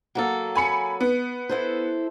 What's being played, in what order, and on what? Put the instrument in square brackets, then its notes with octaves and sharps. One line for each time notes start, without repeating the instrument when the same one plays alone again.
[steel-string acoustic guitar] F#3 A#3 A4
[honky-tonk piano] G#5 B5 C#7
B3
[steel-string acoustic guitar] E4 A4 C5